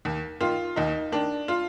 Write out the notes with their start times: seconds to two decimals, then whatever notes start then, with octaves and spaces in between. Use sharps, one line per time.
0.05 D#2
0.41 D#3 F4
0.76 D#2 D#4
1.12 D#3 D4
1.48 F4